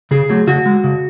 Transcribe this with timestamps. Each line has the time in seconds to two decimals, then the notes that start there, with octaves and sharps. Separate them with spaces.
0.11 C#3 G#4
0.29 F#3 A3
0.47 C#3 F#4
0.66 G#3
0.84 C#3